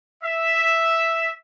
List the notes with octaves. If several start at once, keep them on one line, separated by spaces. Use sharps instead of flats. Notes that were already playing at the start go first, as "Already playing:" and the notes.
E5